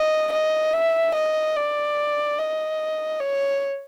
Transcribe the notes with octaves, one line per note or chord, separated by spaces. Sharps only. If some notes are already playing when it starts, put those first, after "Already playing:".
Already playing: D#5
D#5
E5
D#5
D5
D#5
C#5